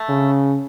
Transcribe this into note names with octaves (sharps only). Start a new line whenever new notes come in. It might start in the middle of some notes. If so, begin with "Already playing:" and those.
Already playing: A3
C#3